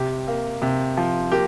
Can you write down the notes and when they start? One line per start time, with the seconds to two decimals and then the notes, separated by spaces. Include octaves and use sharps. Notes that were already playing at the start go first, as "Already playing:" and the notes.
Already playing: C3 G4
0.28 A#3
0.62 C3
0.97 F3
1.32 A#3 G4